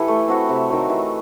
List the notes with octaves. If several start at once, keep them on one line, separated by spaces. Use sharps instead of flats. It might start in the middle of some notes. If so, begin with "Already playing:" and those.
Already playing: E3 E4 G4 A4
A3
C4 F#4 B4
C3
D#3 F#3 A3
E3